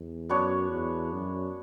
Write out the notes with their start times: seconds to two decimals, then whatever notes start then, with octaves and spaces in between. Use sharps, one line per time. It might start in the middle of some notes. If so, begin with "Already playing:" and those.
Already playing: E2
0.29 F#2 B3 D4 F#4 C#5
0.71 E2
1.12 F#2